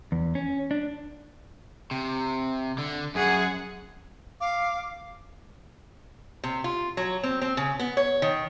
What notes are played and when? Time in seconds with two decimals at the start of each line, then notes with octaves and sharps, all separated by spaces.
0.12 E2
0.35 C#4
0.71 D4
1.91 C3
2.78 D3
3.15 F#2 G#4 F#5
4.40 F5 D6
6.44 C3
6.64 F4
6.97 F#3
7.23 C4
7.41 C4
7.57 C#3
7.79 B3
7.97 C#5
8.22 D#3